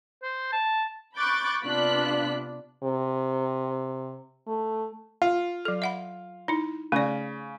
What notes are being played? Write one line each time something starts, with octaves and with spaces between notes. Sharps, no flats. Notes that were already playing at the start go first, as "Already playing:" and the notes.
C5
A5
B5 C#6 D6 F#6 G6 A6
C3 B3 D4 F4 F#6 B6
C3
A3
F4
F#3 A4
E5 F#5 B5
D#4 E4
C#3 A3 D5